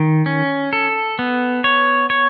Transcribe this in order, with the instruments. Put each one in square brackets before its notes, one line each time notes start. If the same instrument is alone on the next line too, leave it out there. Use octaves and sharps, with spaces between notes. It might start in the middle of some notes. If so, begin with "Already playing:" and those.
Already playing: [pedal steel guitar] D#3
C#4
A4
B3
C#5
C#5